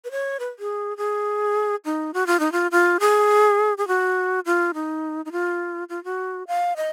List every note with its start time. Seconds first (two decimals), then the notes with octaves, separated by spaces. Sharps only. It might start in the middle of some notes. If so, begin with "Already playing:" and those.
0.05 B4
0.11 C#5
0.40 B4
0.59 G#4
0.97 G#4
1.85 D#4
2.14 F#4
2.27 F4
2.40 D#4
2.52 F4
2.71 F4
3.00 G#4
3.78 G#4
3.88 F#4
4.46 F4
4.74 D#4
5.25 D#4
5.32 F4
5.89 F4
6.04 F#4
6.47 F5
6.77 D#5